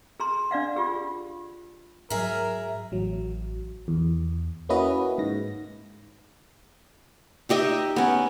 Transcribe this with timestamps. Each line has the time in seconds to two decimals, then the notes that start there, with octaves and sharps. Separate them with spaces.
0.20 G#4 A#5 C6
0.51 D4 D5 F5 F#5
0.76 F4 G4 G#4
2.10 G#2 F#3 G#4 A#4 E5
2.92 A1 F#3
3.88 E2
4.69 A#3 C#4 E4 F#4 B4 D#5
5.18 G#2 A#6
7.49 D#4 G4 D#5 E5
7.96 B3 C#4